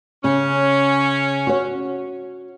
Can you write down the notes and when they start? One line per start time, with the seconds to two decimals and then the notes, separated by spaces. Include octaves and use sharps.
0.24 C#3 C#4
1.47 F#4 C#5